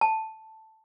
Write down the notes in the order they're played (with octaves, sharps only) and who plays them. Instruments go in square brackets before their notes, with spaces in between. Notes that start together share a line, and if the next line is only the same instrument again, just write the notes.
[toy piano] A5